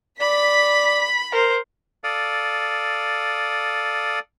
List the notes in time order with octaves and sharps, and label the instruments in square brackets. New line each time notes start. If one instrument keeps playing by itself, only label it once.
[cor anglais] D5 [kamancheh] B5 [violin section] B6
[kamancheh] A#4 C5
[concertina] A4 D5 F5 D#6